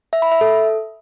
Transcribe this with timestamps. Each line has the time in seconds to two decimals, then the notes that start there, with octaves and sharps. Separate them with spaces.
0.13 E5
0.22 B5
0.32 E5
0.41 A4